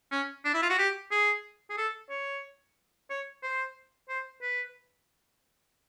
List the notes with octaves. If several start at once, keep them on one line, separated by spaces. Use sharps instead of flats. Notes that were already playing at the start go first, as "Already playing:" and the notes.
C#4
D4
E4
F4
F#4
G4
G#4
G#4
A4
C#5
C#5
C5
C5
B4